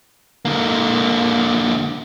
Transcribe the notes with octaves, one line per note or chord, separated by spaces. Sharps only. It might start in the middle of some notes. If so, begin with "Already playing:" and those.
D3 A#3